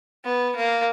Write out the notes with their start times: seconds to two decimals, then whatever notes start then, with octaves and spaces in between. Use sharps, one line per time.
0.25 B3
0.56 A#3